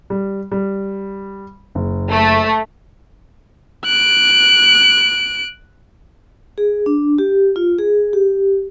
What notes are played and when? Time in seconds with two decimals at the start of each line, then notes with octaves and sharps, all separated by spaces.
0.10 G3
0.52 G3
1.75 F#1
2.11 A3
3.86 F#6 D7
6.58 G#4
6.86 D4
7.18 G4
7.56 F4
7.78 G#4
8.13 G4